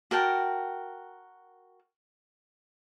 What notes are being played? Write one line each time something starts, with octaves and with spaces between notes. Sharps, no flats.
F#4 A#4 G5 A5